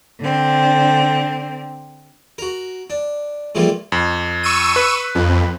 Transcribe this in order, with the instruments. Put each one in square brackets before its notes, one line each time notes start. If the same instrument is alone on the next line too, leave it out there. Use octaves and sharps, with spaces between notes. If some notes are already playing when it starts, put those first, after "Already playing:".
[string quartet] D3 C4
[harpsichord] F#4 A#4
D4
G#2 E3 F3 G3 A3 A#3
[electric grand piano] F2
[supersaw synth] C#6 E6 D#7
[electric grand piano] B4
[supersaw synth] F2